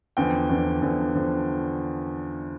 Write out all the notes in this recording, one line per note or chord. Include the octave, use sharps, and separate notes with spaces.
E2 D3 F3 G5
E2 D3 F3
E2 D3 F3
D3 F3